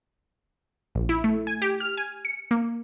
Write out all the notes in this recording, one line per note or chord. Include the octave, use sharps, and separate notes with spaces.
A#1
E4
A3
G#5
G4
F6
G#5
C#7
A#3